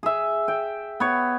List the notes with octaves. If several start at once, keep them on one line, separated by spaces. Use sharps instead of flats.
G#4 E5
G5
B3 C#5